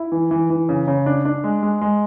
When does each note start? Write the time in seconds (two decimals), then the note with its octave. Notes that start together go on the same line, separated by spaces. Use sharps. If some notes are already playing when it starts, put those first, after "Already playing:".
Already playing: E4
0.12 E3
0.31 E3
0.50 E3
0.69 C#3
0.88 C#3
1.06 D4
1.25 D4
1.44 G#3
1.63 G#3
1.81 G#3